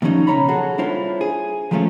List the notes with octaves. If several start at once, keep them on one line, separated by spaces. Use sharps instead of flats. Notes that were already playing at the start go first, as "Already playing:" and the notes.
A2 D#3 F3 G3 C#4 D#4
B1 C#3 F#3 C#5 A#5 B5
F#4 G#4 A4
G3 D4 E4 F4 C5 C#5
G#4
F3 F#3 G#3 A3 C#4 F4